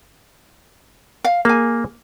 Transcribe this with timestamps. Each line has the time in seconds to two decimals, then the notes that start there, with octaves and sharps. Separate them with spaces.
1.24 F5
1.45 A#3 G#4 G#5